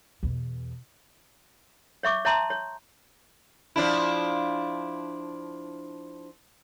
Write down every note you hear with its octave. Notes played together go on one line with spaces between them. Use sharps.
E2 B2
C#5 E5 C#6 D6
C#5 E5 A5 A#5 C6
C#5
F3 D4 E4